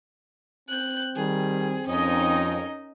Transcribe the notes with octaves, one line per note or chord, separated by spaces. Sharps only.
C4 F#6 G6
D#3 G3 G#4
F2 C#4 D#4 A#4 D#5